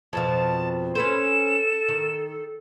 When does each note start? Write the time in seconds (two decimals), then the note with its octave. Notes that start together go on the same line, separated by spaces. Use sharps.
0.13 F2 B2 F3 A5
0.95 C#4 A4 B4 C5 E7
1.89 D#3